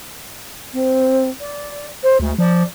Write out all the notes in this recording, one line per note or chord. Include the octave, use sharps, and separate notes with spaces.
C4
D5
C5
D2 G#3
F3 D5